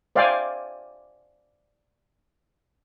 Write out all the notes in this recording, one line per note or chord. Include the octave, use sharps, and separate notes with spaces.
C5 D5 E5 F5 G5 G#5